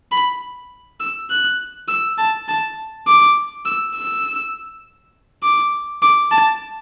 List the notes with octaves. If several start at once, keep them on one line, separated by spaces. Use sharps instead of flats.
B5
E6
F#6
E6
A5
A5
D6
E6
E6
D6
D6
A5